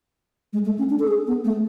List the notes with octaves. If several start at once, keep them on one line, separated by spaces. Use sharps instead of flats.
G#3
A3
C#4
D4
A4
G#4
B3
A3